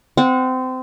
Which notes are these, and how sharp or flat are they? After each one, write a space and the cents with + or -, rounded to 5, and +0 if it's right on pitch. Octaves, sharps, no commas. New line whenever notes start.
C4 -25 F#5 -30